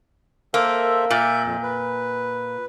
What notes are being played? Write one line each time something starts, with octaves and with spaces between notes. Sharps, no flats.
A#3 A4 C5 E5
A#2 E5 G6
F2
B4